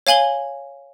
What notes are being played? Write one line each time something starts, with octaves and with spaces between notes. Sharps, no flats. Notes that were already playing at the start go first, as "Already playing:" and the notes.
C#5 F5 G#5 F#7 G7